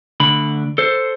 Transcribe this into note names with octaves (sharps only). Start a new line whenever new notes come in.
D2 D3 B5
A4 C5